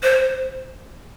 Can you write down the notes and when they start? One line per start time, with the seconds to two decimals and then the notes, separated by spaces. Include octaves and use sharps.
0.03 C5